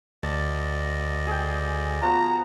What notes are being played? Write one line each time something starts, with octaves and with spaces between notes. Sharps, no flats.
D2 D5 D#5 A5
G#4 G5
F3 B3 F#4 A#5